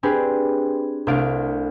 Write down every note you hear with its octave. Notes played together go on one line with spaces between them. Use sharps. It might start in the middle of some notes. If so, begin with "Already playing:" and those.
C4 D4 G4 G#4 B4
C2 C3 A3 D4 F5 D7